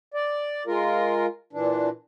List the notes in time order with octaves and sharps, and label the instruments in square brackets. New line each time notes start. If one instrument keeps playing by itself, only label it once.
[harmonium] D5
G#3 F4 A#4
A#2 E3 D4